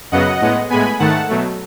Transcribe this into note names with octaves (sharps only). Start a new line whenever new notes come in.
F#2 C#3 F#3 B3 D#5 F#5
A2 G#3 B3
A2 G#3 B3 G#5 B5
G#2 D#3 A3 F#5 A5
B2 F#3 A3